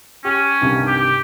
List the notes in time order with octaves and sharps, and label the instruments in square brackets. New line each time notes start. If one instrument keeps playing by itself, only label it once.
[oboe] C#4 [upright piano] G4
[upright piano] C2 G2 D#3
[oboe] G4